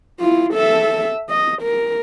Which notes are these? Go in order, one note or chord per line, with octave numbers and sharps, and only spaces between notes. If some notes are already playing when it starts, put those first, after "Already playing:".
E4 F4
A4 E5
D#5
A#4